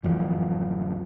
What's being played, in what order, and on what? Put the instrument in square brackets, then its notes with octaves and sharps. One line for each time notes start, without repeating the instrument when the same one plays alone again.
[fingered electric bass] D1 F#2 E3 F3